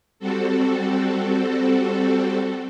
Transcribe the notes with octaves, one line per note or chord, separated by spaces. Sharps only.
G3 C4 F#4 A4